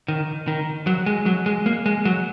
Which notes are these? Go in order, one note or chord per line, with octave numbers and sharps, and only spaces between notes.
D#3
D#3
F#3
G#3
F#3
G#3
A#3
G#3
F#3